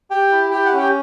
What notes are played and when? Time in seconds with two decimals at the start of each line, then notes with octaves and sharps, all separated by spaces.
0.10 G4 G5
0.32 E4
0.51 G4 G5
0.65 F#5
0.72 C#4
0.77 G4 G5